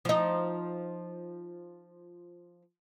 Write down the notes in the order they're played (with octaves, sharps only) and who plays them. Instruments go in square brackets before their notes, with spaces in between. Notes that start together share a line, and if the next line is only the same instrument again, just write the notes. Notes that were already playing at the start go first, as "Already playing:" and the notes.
[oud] F3 D#4